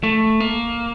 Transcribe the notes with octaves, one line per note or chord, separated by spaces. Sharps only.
A3
A#3